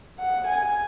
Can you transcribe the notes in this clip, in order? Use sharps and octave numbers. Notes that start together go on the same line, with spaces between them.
F#5
G#5